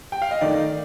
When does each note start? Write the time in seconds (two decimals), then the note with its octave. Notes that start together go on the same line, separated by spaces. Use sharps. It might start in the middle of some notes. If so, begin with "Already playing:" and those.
0.12 G5
0.22 F5
0.31 D#5
0.41 D#3 A3 D#4 D5